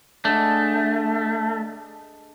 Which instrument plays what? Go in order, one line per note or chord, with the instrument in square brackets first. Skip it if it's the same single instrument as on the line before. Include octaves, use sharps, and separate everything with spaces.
[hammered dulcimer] D3 G#3 D4 [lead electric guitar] A3